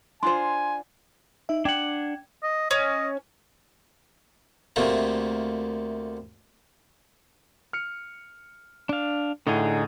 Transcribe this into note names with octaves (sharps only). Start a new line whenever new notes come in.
D4 F4 C5 G#5 C6
D#4 E5
D4 F#5 G5 G#6
D#5
C#4 D#5
D2 C3 A3 A#3
F6 C#7
D4 F5
A2 D3 D#4 G#4 F#5 D#7